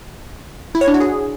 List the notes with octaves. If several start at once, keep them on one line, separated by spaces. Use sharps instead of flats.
E4
C#5
D4
F#4
G#4